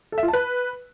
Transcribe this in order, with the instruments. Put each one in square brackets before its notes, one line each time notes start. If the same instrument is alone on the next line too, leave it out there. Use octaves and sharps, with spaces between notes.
[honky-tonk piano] A4
E5
F4
A5
B4